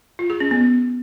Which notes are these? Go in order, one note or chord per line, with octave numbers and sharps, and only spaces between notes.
F4
G#4
C#4
B3